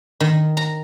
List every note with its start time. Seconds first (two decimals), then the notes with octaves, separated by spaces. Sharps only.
0.20 D#3
0.57 A#5